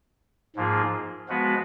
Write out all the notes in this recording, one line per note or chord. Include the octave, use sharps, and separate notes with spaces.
G#2 F3 A#3 F4 G#4
F3 G#3 B3 F#4 B4